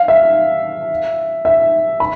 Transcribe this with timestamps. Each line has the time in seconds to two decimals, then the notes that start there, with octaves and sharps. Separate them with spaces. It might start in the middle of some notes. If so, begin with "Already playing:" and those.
Already playing: F5
0.08 E5
1.45 E5
2.00 B5